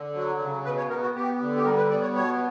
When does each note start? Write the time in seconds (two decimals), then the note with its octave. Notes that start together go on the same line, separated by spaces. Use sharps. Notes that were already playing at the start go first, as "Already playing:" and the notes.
Already playing: D3
0.15 F#3
0.40 C#3
0.65 B2 B4
0.77 C#5
0.90 B3 A#4
1.02 F#4
1.14 B3 G4
1.40 D3
1.56 G4
1.65 G3 A#4
1.77 B4
1.90 B3 D5
2.02 C#5
2.15 B2 C#5